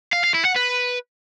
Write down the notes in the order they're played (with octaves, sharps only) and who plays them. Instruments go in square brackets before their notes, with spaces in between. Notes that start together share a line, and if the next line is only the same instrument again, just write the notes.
[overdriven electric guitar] F5
F5
E4
F#5
B4